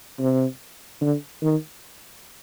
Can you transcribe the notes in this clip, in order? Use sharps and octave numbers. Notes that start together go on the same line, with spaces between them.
C3
D3
D#3